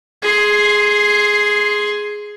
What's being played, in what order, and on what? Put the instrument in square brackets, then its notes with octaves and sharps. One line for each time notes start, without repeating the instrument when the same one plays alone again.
[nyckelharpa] G#4 C6